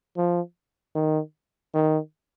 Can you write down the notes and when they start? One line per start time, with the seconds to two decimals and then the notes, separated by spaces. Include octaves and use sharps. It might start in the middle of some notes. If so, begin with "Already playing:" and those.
0.17 F3
0.95 D#3
1.74 D#3